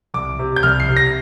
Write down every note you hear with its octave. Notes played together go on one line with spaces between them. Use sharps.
C2 D6
C3
G6
C2 F6
C7
C3
A#6